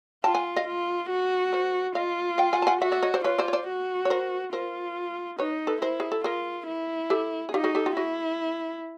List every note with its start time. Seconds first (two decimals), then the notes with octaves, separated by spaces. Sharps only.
0.24 F4 G5 A5
0.35 F#5 G#5
0.56 D#5 F5
0.67 F4
1.10 F#4
1.53 A#4 C5
1.95 F4 D#5 F5
2.38 F5 G5
2.53 F#5 G#5
2.62 A5
2.67 F#5 G#5
2.81 F#4 E5 F#5
2.92 D5 E5
3.03 C#5 D#5
3.14 C5 D5
3.24 F4 B4 C#5
3.38 C5 D5
3.48 C#5
3.53 C5 D5
3.67 F#4
4.05 C#5
4.10 A#4 C5
4.53 F4 A#4 C5
5.39 D#4 B4 C#5
5.67 A4 B4
5.82 E4 A#4 C5
6.00 G#4
6.12 A4
6.24 F4 G#4 A#4
6.67 E4
7.10 G4 A4
7.49 G#4
7.54 D#4 F4 G4
7.64 F#4 G#4
7.75 G4 A4
7.86 F4 G4
7.96 E4 F#4 G#4